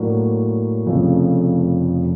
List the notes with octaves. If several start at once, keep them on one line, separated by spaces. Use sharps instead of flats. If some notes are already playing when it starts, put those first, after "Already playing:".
Already playing: A2 F#3 A#3 D4
F1 F2 C#3 F3 A3